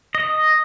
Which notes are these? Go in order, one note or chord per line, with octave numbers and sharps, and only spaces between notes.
D#5